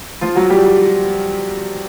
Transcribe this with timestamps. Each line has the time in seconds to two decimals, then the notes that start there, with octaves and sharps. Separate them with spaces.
0.21 F3 F4
0.36 F#3 F#4
0.50 G3 G4